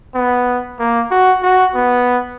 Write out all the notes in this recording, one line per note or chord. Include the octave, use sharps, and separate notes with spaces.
B3
A#3
F#4
F#4
B3